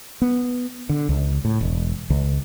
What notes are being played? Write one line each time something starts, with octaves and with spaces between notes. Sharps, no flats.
B3
D3
C#2
A2
E1
C#2